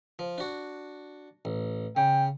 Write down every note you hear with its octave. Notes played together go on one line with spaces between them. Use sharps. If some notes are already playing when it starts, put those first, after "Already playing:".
F3
D4 F#4
A1
C#3 G5